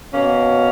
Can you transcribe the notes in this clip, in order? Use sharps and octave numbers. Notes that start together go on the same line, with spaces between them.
B2 A#3 C#4